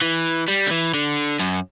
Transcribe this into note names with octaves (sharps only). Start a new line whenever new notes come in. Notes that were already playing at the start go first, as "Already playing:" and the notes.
E3
G3
D3
E3
D3
F#2